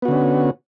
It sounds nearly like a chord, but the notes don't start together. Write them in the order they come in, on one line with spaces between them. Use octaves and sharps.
B3 F#4 D3 C#4